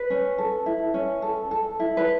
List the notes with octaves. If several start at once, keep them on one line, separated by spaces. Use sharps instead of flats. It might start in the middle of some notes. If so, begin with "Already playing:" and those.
Already playing: B4
C#4
A4
E4
C#4
A4
A4
E4
B4